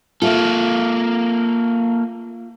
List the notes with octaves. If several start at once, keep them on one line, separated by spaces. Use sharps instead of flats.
A#3 F4 A4 E5